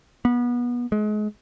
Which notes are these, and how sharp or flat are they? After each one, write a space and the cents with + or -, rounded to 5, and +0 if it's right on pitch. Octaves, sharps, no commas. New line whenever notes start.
B3 -25
G#3 +30